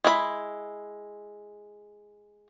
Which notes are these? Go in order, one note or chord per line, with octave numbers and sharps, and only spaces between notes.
G#3 E4 A#4 B5